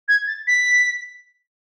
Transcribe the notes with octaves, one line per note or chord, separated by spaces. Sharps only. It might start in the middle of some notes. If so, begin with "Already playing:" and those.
G#6
A6
B6